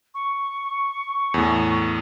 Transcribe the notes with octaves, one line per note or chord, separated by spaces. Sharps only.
C#6
E2 A2